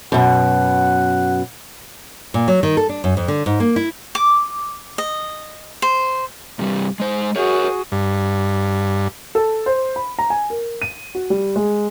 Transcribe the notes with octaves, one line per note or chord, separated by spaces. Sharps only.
F#2 B2 F#5
A#2
F#3
D#3
A4
D4
F#2
F2
D3
G#2
A#3
E4
D6
D#5
C5
G2 C3 G3
G#3 C5
F#4 G#4 A#4 C#5
G2
A4
C5
B5
A#5
G#5
A#4
D#7
F#4
G3
G#3